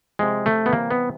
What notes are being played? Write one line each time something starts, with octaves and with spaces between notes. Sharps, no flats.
C3 F3 G#3
A3
B3
C3 E3 G3 A#3
B3